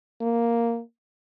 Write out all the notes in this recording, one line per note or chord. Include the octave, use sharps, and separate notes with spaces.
A#3